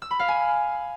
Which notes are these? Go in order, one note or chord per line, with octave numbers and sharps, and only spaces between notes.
E6
B5
F5
G#5